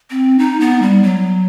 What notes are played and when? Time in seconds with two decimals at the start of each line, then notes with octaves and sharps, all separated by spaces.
0.10 C4
0.39 D#4
0.60 B3
0.82 G3
1.03 F#3